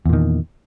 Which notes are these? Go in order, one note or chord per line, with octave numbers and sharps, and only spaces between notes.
E2 A#2 D#3